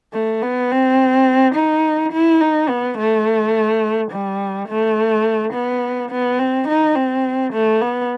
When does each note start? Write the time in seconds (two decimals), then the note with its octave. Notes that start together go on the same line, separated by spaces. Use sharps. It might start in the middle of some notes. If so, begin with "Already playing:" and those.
0.13 A3
0.42 B3
0.71 C4
1.55 D#4
2.13 E4
2.41 D#4
2.69 B3
2.99 A3
4.11 G3
4.69 A3
5.54 B3
6.11 B3
6.39 C4
6.68 D#4
6.96 C4
7.53 A3
7.81 B3